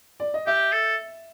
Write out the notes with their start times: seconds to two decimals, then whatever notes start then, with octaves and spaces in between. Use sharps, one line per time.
0.20 D5
0.34 D#5
0.47 G4 E5
0.73 A4